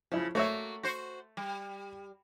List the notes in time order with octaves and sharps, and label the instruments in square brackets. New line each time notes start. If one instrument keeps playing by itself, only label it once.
[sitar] C#3 [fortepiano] F3 E4
[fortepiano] A3 C#5 E5 [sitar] A#3 F#4
[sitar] F#4 C5
G3